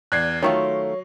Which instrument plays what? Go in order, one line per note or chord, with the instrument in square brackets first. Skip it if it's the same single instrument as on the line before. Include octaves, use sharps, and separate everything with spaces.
[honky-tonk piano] E2 D5 C7 [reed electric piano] F#6 G#6
[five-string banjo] D#3 A3 F4 [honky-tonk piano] F#3 [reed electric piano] C#5